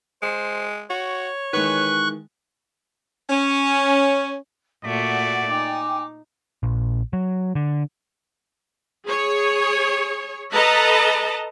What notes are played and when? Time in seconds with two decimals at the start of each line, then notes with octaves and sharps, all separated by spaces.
0.23 G#3 C5
0.90 F#4 C#5
1.53 D#3 E3 G#3 B4 C#6 F#6
3.30 C#4
4.84 A#2 A3 F#4 D5 F#5 B6
5.50 D#4 G5 G#5 D6
6.63 A#1
7.13 F#3
7.55 D3
9.07 G#4 C#5
10.53 A4 B4 D#5 A5 A#5